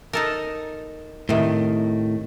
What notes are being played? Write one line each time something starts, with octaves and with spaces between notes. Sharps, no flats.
D#4 A4 A#4
A2 C3 D#3